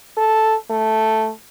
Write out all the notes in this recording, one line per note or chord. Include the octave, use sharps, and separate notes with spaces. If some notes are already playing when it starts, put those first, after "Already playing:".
A4
A3